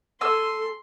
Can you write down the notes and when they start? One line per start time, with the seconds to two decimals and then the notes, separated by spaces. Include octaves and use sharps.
0.21 A4 G#5 A5 C6 E6